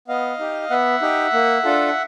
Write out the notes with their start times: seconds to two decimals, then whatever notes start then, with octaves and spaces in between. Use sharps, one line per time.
0.08 B3 D#5 F5
0.39 D#4 G4
0.70 B3 E5 F#5
1.02 D#4 G4
1.33 A#3
1.64 D4 F4 A4